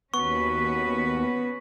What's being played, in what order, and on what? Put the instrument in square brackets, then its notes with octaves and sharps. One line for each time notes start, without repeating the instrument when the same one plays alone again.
[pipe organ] D#2 [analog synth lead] B3 [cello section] C#4 F#4 B4 [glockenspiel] C#6